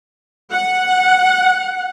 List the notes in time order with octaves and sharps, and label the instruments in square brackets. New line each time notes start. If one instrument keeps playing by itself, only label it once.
[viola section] F#5